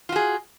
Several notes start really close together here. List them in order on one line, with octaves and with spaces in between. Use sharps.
F4 F#4 G#4